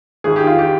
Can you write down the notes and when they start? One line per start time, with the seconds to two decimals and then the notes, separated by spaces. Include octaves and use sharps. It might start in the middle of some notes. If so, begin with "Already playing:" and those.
0.24 G#1 G#4
0.36 D#3 G4
0.47 F4
0.59 G4